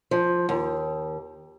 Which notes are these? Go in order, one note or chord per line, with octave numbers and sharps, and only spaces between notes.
F3
D#2